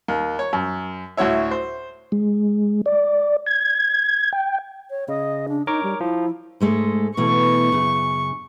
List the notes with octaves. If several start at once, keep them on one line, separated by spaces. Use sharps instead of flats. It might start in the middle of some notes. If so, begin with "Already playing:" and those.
D#2
C#5
F#2
D2 A2 F#4 C#5 E5
C5
G#3
D5
G#6
G5
C#5
C#3 D#5
D4
D#4 A#4 C#5 D6
G3
F3 E4
G#2 G#3 A3
B2 E3 A3 C#6
F#2 C#3